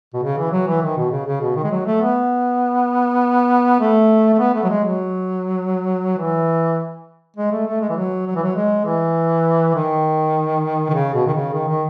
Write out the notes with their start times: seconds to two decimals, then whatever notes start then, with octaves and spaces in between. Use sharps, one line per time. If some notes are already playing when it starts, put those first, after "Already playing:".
0.14 B2
0.23 C#3
0.38 E3
0.52 F#3
0.67 E3
0.82 D#3
0.97 B2
1.12 C#3
1.26 C#3
1.42 B2
1.56 D#3
1.64 G#3
1.72 F#3
1.86 A3
2.02 B3
3.80 A3
4.34 A3
4.39 B3
4.55 A3
4.64 F#3
4.69 G#3
4.84 F#3
6.18 E3
7.36 G#3
7.52 A3
7.67 A3
7.81 G#3
7.90 E3
7.96 F#3
8.27 F#3
8.35 E3
8.43 F#3
8.56 G#3
8.85 E3
9.75 D#3
10.90 D#3
10.94 C#3
11.14 B2
11.27 D#3
11.34 C#3
11.53 D#3
11.68 D#3